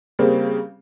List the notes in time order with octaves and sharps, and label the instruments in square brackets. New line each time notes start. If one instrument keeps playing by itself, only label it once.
[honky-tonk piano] C#3 G3 A#3 C4